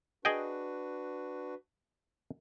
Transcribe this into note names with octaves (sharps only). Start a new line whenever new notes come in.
D4 F#4 G#4 B4 D#5 G5